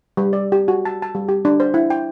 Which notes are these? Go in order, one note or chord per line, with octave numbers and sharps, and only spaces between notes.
G3
D5
G4
F#4
A5
A5
G3
G4
D4
C5
E4
G5